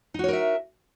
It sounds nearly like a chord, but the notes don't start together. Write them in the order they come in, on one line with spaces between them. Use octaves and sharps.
D#4 F#4 C#5 A#4 E5